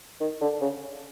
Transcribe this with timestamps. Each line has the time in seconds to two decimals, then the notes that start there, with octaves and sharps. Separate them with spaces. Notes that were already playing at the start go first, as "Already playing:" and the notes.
0.20 D#3
0.41 D3
0.61 C#3